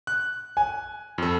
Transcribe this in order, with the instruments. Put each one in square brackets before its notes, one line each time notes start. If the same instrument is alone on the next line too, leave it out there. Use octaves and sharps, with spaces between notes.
[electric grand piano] F#6
[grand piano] G#5
[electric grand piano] F2 A4